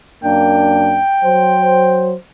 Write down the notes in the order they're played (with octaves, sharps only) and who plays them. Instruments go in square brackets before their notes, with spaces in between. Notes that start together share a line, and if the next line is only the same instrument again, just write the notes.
[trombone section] F#2 A#3 D4 [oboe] G5
[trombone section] F#3 C5